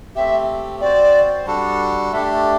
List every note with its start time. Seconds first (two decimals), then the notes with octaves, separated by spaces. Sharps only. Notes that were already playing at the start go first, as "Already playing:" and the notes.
0.15 A3 C4 G4 E5
0.80 C4 F#4 C5 D5
1.46 G3 D4 F#4 A4
2.12 A3 D4 G4 E5